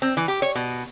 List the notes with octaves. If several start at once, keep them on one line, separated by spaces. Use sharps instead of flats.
C4
E3
G4
C#5
B2